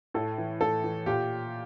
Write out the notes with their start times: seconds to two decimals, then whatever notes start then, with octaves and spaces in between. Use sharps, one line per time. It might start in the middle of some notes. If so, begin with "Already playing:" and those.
0.14 A2 A4
0.38 E3
0.61 A2 A4
0.84 E3
1.06 A#2 G4